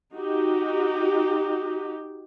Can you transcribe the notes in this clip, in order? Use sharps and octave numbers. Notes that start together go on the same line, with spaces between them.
D#4 F#4 G4